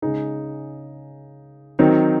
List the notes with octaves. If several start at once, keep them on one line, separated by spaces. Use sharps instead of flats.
C#3 G#3 D#4 G#4
D#3 F#3 C4 D#4